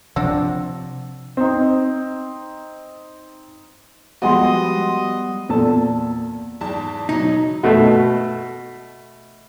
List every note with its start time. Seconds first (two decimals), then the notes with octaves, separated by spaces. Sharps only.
0.16 C3 F3 C4 D4 F#5
1.37 C4 D#4
4.22 F3 G3 G#3 B3 F#4 D#5 F#5 C6
5.49 E2 A#2 A4 A5
6.61 E2 G#2 A5
7.09 B2 E3 F#3 D#4
7.63 B2 A3